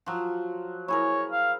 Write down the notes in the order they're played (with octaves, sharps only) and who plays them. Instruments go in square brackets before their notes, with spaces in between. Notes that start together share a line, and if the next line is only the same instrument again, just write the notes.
[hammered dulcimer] F3 F#3
[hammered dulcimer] E4 G#4 A#4 [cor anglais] C#5
[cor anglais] F5